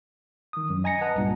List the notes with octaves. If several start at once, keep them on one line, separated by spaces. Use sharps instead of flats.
D#3 D#6
F#2
D#5 G#5 A#5 A#6 C#7
B4 D#5 F#5 A5 A#5
C2 G2 A#2